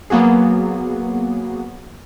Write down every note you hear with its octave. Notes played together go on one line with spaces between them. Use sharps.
F#3 A#3 B3 F#4 G#4